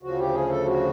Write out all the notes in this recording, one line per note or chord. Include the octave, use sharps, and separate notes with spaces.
D2 C#3 F3 F#4
G4
G#4
A4
F#4